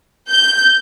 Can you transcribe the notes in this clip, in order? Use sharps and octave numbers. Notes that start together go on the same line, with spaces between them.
G6